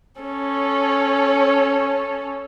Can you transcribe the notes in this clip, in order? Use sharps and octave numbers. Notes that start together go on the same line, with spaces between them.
C#4 A4 C#5